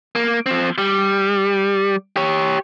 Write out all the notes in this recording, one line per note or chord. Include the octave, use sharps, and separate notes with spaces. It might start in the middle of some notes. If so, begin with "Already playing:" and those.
A#3
F3 C4
G3
G4 C#5